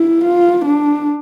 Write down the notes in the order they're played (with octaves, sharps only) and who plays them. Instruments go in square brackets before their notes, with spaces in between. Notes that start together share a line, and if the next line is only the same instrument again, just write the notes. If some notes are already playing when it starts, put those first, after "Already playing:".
Already playing: [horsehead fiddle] E4
F4
D4